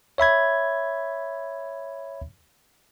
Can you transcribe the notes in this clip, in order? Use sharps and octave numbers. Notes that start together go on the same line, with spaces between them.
C#5 E5 B5 G#6